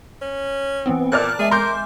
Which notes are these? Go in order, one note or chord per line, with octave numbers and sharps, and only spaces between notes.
C#4
E3 B3 C4
A#2 A#4 D5 A5 F6 F#6
G#3 G#4 E5 G#5
A#4 C6 D6 G6